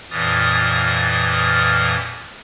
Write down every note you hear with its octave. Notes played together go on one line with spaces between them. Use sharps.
F2 A#2 E3 D#6 F6 A6